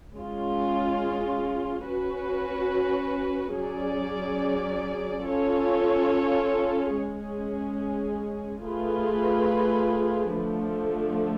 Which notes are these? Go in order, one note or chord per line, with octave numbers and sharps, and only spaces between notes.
G#3 C#4 F4
C#4 F#4 B4
F#3 C#4 G#4 D5
C#4 F4 A4 C#5
G#3 C#4 G#4
A3 F4 G#4 B4
D3 F3 A3